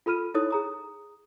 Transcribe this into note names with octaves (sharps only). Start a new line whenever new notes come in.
F4 A4 B5 F6 D#7
D#4 E4 A4 C#5 D#6
G#4 A#5 D#6